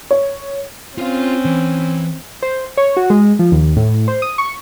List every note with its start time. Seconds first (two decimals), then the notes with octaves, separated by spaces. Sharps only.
0.11 C#5
0.98 C4 C#4 F4 F5
1.45 E3
2.42 C5
2.77 C#5
2.97 F#4
3.10 G#3
3.39 F3
3.52 D#2
3.77 A2
4.08 C5
4.22 D#6
4.38 C#6